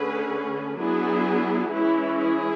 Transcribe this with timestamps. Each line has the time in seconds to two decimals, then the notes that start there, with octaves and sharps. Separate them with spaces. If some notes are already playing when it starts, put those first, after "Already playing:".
Already playing: D3 A3 C#4 G#4 B4
0.78 F#3 B3 D4 E4 G#4
1.71 E3 G#3 C#4 E4
2.17 E4 G#4